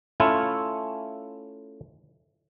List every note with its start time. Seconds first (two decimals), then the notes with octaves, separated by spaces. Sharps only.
0.20 A3 C#4 E4 F4